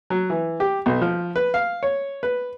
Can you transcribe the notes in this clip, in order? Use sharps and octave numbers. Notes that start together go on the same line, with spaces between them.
F#3
E3
G4
B1
F3
B4
F5
C#5
B4